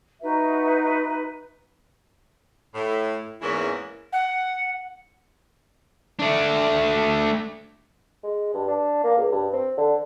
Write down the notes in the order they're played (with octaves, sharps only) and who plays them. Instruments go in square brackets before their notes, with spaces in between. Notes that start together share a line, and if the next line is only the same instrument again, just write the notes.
[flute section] D#4 F#4 B4 E5
[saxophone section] A2
E2 G#2 E3 A#3 C#4 E4
[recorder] F#5
[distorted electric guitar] A3 D4
[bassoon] G#3
G2
D4
A#3
C#2
G2
C4
D3